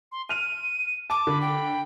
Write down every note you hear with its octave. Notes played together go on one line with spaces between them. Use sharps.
C6
F6 D#7 F7
A5 D6
D3 B5
G5